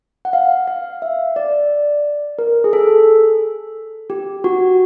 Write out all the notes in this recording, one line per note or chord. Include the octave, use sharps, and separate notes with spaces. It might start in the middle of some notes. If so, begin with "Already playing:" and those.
F#5
F5
F5
E5
D5
A#4
G#4
A4
G4
F#4